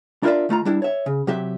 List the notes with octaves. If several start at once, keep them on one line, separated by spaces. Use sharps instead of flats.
D4 E4 F4 A#4 D5 E5
D#3 A3 F4 A#5
G3 D4 E4
C#5 E5
C#3
C3 F#3 G4 E5